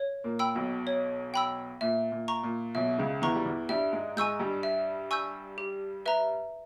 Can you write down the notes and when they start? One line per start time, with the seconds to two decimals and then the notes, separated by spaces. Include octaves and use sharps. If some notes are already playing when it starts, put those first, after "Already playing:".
Already playing: C#5
0.24 A#2 A#3
0.39 G5 B5 E6
0.55 B1 B2
0.87 C#5
1.34 G5 B5 E6
1.81 A#2 E5
2.12 A#2
2.28 A#5 C#6
2.43 A#2
2.75 B1 B2 E5
2.98 C#2 C#3
3.22 E2 E3 A#5 C#6
3.35 G3
3.45 E2 E3
3.69 G2 G3 E5
3.93 G#2 G#3
4.16 G#2 G#3 G#5 C#6 E6 G6
4.40 G2 G3
4.63 E5
5.11 G#5 C#6 E6 G6
5.58 G4
6.06 B4 E5 A#5